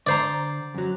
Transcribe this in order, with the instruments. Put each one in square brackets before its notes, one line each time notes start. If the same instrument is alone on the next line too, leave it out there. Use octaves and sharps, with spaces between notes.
[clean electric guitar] D3 A#5 [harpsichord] C5 D5
[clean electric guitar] F#2 F#3